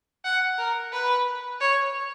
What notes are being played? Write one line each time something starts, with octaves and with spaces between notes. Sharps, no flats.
F#5
A#4
B4
C#5